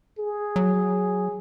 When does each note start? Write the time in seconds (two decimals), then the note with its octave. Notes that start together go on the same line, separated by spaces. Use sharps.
0.19 G#4
0.56 F#3